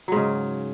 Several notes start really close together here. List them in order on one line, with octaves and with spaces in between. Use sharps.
F#3 G#2 C#3